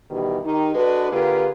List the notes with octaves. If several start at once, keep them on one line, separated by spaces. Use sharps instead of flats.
B2 D#3 E3 G3
D#3 D#4 G4
G#3 D4 F#4 A4 B4
D3 A#3 F4 G4 G#4 B4